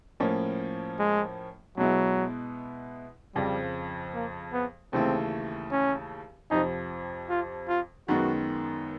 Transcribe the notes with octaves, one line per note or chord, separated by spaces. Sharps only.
A2 F3 A#3 C#4
G#3
B2 F#3 G#3 B3 E4
F2 C#3 F3 G3
A#3
B3
D#2 C#3 E3 A3 C4
C#4
F2 C3 F3 D#4
F4
F4
F#2 D#3 G#3 B3 F#4